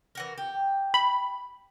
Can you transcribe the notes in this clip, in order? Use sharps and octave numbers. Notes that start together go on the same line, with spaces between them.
E3 F#4 A#4
G4
B5